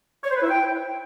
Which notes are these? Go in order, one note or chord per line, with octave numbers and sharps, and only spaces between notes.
C#5
C5
B4
E4
G5